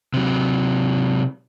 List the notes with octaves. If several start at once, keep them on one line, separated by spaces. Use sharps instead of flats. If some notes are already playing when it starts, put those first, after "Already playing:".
C3 F#3